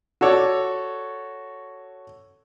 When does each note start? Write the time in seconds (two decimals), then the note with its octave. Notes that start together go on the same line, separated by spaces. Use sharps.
0.21 F#4 A4 C#5 D5